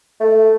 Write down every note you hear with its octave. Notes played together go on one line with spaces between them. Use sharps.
A3